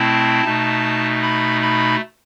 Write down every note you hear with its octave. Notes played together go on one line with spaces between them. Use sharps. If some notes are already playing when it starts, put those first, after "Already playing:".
Already playing: B2 A3 C4 E4 A5
B2 A3 D#4
B5
B5